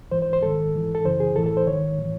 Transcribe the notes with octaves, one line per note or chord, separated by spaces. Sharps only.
G#2 E3 C5
C5
C5
G#2 D#3 A4
G#2 E3
A4
F#2 C#3 E3 C5
G#4
A2 E3 A4
A4
C5
G#2 D#3 C#5
A2 E3